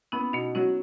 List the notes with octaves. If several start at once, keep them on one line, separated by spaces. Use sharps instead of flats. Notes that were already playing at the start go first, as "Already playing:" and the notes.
B3 C#4 E4
B2 B3 D#4
F#3 C#4 E4